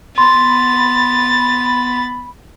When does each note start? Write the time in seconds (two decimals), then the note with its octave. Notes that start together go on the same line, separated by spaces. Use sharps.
0.18 B3 B5 C6 A6